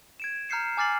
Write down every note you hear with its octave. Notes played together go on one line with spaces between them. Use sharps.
G#6 D7 E7
A#5 F6 G6 C7 C#7 E7
G#5 D6 F6 A6 C7 F#7